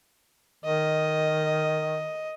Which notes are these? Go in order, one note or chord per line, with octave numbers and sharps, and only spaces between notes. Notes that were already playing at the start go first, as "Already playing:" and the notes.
D#3 D#5